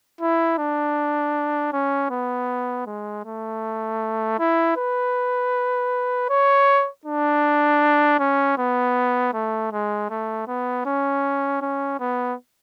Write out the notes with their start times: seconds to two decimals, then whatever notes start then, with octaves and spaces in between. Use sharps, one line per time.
0.21 E4
0.58 D4
1.73 C#4
2.10 B3
2.86 G#3
3.25 A3
4.39 E4
4.77 B4
6.29 C#5
7.05 D4
8.19 C#4
8.58 B3
9.33 A3
9.72 G#3
10.10 A3
10.48 B3
10.85 C#4
11.62 C#4
12.00 B3